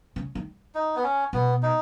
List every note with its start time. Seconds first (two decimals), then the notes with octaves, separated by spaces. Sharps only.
0.16 C#3
0.35 D#3
0.75 D#4
0.96 B3
1.04 C#4
1.33 B2 B3
1.63 D#4